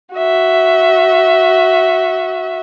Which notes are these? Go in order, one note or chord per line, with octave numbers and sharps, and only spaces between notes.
F#4 E5